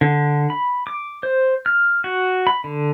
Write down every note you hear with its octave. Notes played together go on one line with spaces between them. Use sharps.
D3
B5
D6
C5
F6
F#4
B5
D3